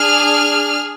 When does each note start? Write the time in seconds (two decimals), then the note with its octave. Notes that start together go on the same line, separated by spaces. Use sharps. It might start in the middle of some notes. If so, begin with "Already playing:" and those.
Already playing: D4 G#4 F6